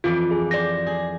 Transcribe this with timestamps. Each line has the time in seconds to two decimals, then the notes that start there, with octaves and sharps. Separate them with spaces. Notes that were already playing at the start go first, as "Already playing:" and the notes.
0.04 F2 E3 F4 D5
0.31 G#4
0.51 G4 C5 D5 A#6
0.87 G#4